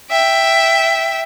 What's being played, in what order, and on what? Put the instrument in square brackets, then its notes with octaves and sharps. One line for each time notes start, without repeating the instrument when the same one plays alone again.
[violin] E5 G5